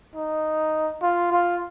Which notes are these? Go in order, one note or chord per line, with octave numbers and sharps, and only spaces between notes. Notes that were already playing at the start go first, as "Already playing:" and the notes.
D#4
F4
F4